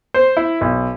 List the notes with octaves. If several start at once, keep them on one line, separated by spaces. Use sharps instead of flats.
C5
E4
B1